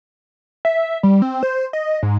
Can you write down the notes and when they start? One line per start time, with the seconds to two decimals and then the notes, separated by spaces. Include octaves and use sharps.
0.65 E5
1.03 G3
1.22 C4
1.43 C5
1.73 D#5
2.03 G#2